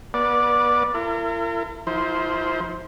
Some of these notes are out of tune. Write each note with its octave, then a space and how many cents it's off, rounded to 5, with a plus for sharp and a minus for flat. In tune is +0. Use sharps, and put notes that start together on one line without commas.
B3 -30 D5 +0
E4 +45 A#4 -40
F3 +0 E4 -40 C5 +0